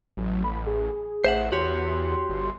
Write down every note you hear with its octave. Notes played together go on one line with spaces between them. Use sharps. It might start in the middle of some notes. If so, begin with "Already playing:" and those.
A1 F#3
B5
G#4
A1 C5 E5 F#5
E2 F#4 G4 C#5 C6
G1